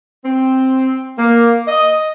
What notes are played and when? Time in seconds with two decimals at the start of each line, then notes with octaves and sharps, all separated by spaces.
0.25 C4
1.17 A#3
1.66 D#5